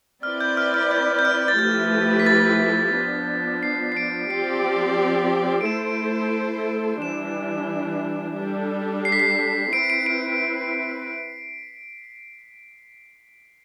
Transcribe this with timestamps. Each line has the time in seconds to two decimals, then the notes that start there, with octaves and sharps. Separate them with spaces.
0.23 C4 E4 B4 D5 F6
0.41 G6
0.57 F6
0.74 F6
0.91 G6
1.19 G6
1.25 F6
1.48 A6
1.59 F3 A3 E4 G4 B4 G6
2.20 B6
2.26 A6
2.95 F3 B3 D4
3.63 C7
3.92 C7
3.97 D7
4.30 F3 C4 G4 D5 C7
5.61 D7
5.66 A3 E4 A4 C5 E7
7.01 E3 G3 D4 E7
8.37 G3 D4 A4
9.05 C7
9.12 B6
9.19 C7
9.73 C4 E4 B4 D7
9.90 D7
10.06 D7